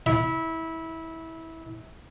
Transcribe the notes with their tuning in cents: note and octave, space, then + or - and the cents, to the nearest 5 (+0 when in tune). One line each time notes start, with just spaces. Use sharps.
E4 -20